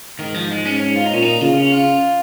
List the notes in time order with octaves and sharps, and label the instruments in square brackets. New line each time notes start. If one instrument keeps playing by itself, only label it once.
[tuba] G#2 [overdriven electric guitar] D#3
[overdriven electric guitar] F3
G#3
C#4
C#4
F4
D#4
[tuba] A#2 [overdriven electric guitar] C#4
[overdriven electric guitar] D#4
[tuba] C#3 [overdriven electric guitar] F4
[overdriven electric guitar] C#4
F4